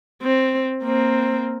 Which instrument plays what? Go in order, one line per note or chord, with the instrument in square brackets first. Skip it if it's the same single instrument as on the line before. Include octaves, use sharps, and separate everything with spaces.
[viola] C4
A#3 C4